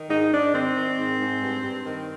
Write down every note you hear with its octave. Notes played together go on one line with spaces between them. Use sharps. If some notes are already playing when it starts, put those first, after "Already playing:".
Already playing: D#3
G#2 D#4
G#2 D4
D#3 C4
D#3
G#2
G#2
G2
G2
D#3